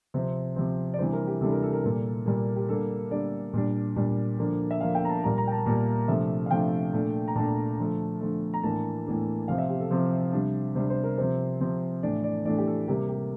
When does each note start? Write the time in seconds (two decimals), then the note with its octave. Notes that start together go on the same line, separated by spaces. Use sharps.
0.14 C3 F3 C4 C5
0.56 C3 F3 C4
0.94 D5
0.99 C3 E3 G3 D4 C5
1.13 A#4
1.27 G4
1.41 C3 E3 G3 D4 A4
1.52 A#4
1.63 A4
1.73 A#4
1.84 A#2 G3 A#3 A4
2.26 A#2 G3 A#3
2.56 G4
2.69 D3 G3 A#3 D4 A4
3.11 D3 G3 A#3 D4 D5
3.53 A#2 G3 D4
3.96 A#2 G3 D4
4.39 D3 F3 A#3 D4
4.71 E5
4.81 D3 F3 A#3 D4 F5
4.95 G5
5.05 A#5
5.09 A5
5.23 A#2 G3 A#3 A#5
5.38 A#5
5.47 G5
5.52 A5
5.66 A#2 G3 A#3
6.08 C3 F3 A3 D4 E5
6.46 F5
6.51 C3 F3 A3 D4 G5
6.93 A#2 A3 D4
7.28 A#5
7.35 A#2 A3 D4 A5
7.78 D3 F3 A3
8.21 D3 F3 A3
8.54 A#5
8.63 A2 E3 A#3 D4 A5
9.06 A2 E3 A#3 D4
9.48 C3 F3 C4 F5
9.58 E5
9.69 G4
9.80 A4
9.90 C3 F3 C4 C5
10.33 C3 G3 D4
10.75 C3 G3 D4 C5
10.90 C5
11.03 A#4
11.18 C3 F3 C4 C5
11.60 C3 F3 C4
12.03 A2 E3 A3 D4 D5
12.24 D5
12.45 A2 E3 A3 D4 D5
12.58 G4
12.67 A4
12.88 C3 G3 A#3 G4
13.09 G4